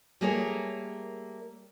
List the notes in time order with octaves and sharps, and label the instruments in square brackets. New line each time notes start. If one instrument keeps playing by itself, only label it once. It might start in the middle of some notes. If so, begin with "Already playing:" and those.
[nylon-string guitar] G3 A3 A#3 G#4 A#4 C#5